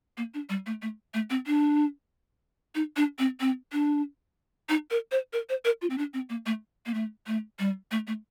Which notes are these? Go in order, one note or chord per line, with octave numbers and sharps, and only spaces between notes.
A#3
D4
G3
A3
A3
A3
C4
D4
D#4
D4
C4
C4
D4
D#4
A#4
C5
A#4
C5
A#4
F4
C4
D4
C4
A#3
A3
A#3
A3
A3
G3
A3
A3